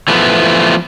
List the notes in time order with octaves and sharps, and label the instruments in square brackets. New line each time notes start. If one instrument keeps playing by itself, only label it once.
[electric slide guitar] E3 F3 A3 B3